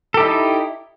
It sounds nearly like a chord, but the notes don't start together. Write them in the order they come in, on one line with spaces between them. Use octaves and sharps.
A4 G4 E4 D#4